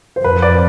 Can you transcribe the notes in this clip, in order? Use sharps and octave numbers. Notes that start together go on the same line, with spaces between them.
C5
F2 B4
D5